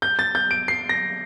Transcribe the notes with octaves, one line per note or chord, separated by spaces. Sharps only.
G6
A6
G6
D7
C7
A#6